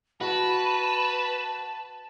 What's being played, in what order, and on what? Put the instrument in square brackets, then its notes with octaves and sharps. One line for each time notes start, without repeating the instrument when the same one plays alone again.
[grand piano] F#4 [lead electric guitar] B4 [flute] A5